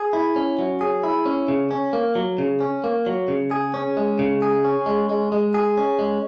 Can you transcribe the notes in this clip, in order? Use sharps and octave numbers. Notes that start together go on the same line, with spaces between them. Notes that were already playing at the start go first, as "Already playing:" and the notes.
Already playing: G#4
E4
C#4
F#3
G#4
E4
C#4
C#3
C#4
A#3
F#3
C#3
C#4
A#3
F#3
C#3
G#4
C#4
G#3
C#3
G#4
C#4
G#3
G#3
G#3
G#4
C#4
G#3